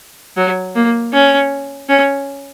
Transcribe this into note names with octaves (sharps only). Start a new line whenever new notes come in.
F#3
A#3
C#4
C#4